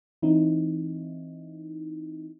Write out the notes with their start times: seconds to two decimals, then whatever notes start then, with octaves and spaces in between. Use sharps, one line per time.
0.22 E3 C4 D#4 E4